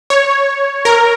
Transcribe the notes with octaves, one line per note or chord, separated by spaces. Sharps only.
C#5
A#4